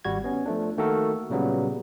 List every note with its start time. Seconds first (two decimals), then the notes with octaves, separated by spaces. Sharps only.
0.05 G#1 G3 F#4 G#6
0.24 B3 C#4
0.46 F3 A3 D4
0.78 D#3 A3 A#3 F#4 A4 A#4
1.30 A#2 C#3 F#3 G3 B3